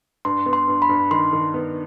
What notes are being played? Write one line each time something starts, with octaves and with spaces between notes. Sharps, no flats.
G2 C6
B3
C6
G2
B5
G2
D#3 C6
D#3
B3